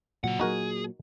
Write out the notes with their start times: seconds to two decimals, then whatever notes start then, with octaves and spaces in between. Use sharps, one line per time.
0.24 A#2 C#3 F#3 F#5
0.40 A#2 F#3 D#4 F#4 G#4 A#4